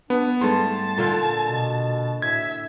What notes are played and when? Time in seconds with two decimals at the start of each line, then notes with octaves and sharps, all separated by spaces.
0.10 B3 D4
0.41 G#2 G3 A3 A5 C6
0.97 A#2 D3 F4
1.49 B2
2.22 A2 E5 G#6